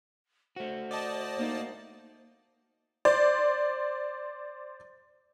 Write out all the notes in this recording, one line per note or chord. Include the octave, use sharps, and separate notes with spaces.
A3 F#4 C5
D5 D#5 A5
A#3 D#4
C5 D5